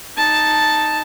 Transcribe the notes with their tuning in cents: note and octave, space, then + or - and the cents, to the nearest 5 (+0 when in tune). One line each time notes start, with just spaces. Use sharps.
D#4 +0 A5 +0